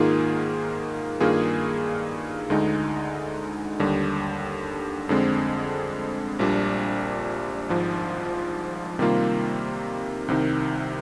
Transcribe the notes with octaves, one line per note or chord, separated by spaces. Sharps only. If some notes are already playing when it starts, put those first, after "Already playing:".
Already playing: G#2 D#3 A#3 F4 G#4
G2 D#3 A#3 F4 G#4
D2 D3 G#3 D#4
D#2 D3 G3
F2 D3 G#3 C4
A#1 A#2 G3 D4
G#1 G#2 F3
C3 D#3 G3 A#3 F4
C2 C3 D#3